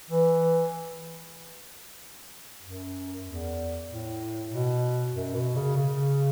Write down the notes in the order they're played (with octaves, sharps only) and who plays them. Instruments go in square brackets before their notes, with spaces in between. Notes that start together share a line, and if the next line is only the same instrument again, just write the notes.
[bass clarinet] E3
F#2
E2
A2
B2
F#2
B2
C#3
C#3